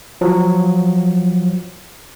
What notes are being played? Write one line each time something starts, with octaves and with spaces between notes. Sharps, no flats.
F3 F#3